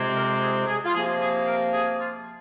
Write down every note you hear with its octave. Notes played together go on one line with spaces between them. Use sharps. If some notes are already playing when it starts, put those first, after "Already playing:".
Already playing: F2 C3 G#3 C4
A#4
G#4
G#4
F4
C3 F3 A#3 G#4
G#4
A#4
G#4
F4